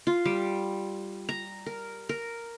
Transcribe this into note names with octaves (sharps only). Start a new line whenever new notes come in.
F4
G3
A#5
A#4
A#4